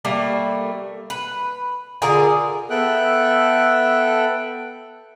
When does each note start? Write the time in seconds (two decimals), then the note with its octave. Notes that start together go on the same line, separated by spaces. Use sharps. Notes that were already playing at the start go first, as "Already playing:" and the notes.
0.05 G3 A3 A#3
1.10 B4
2.02 D3 F4 G#4 A#4
2.70 B3 A4 E5 G5 F#6